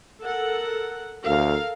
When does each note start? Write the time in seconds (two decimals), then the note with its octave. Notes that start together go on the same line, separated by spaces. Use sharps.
0.22 A4 A#4 F#5
1.26 D2 A4 A#4 F5